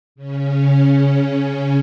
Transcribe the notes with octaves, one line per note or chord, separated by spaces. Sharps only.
C#3 C#4